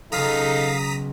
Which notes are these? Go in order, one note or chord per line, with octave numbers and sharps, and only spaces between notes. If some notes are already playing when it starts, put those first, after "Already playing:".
B1 C#3 D#4 A4 F5 A#5 D#6 B6